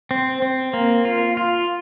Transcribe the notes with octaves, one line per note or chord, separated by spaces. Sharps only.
C4
C4
A#3
F4
F4